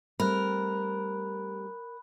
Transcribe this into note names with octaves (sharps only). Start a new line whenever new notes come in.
G3 A3 C4 A#4 B5 F#6